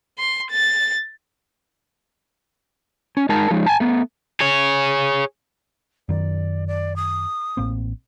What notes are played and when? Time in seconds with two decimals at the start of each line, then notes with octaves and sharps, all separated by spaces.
0.19 C6
0.51 A6
3.17 C#4
3.29 G#3 D#4 A#4 A5
3.51 F3 G#3 D#4
3.66 G#5 A5
3.80 A3 B3
4.40 G#4 C#5
6.09 F#2 D#3 D5
6.67 D5
6.96 D#6
7.57 A1 A#3 C4